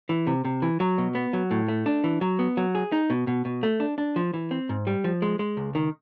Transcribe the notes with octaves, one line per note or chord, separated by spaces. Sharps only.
E3
C3
C3
E3
F#3
B2
B3
F#3
A2
A3
D4
E3
F#3
B3
F#3
G#4
D#4
B2
B2
B2
A3
D4
D4
F3
E3
C4
G#2
G3
F3
G#3
G#3
C#2
D#3